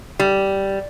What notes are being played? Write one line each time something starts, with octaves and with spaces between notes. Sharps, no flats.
G3